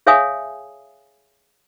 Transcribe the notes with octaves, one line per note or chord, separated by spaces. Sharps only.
G#4 C#5 E5 F5 G#5 D#6